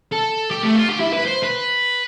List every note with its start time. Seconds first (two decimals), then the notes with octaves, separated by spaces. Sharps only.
0.13 A4
0.51 G4
0.63 A3
0.75 F4
0.88 G4
1.00 E4
1.13 B4
1.26 C5
1.44 B4